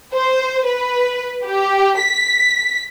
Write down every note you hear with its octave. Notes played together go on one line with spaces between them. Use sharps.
C5
B4
G4
B6